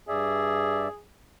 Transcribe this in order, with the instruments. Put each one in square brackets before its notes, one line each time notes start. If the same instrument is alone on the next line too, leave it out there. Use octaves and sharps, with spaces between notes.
[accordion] G2 D5 E5 [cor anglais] G#4